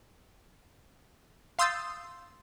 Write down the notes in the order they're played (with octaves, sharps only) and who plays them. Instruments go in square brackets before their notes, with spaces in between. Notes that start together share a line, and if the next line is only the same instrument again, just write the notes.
[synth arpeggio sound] F5 C6 D#6 E6 G6 A6